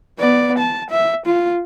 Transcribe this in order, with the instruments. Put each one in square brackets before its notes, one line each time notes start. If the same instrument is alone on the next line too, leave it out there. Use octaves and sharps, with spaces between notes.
[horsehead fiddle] B3 D5
A5
E5
F4